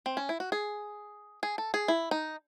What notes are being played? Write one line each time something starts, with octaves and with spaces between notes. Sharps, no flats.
C4
C#4
E4
F#4
G#4
G#4
A4
G#4
E4
D#4